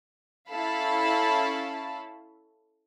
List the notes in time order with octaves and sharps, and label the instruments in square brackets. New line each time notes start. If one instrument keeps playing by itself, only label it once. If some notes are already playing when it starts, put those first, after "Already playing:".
[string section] C#4 E4 A4 F5 A5 B5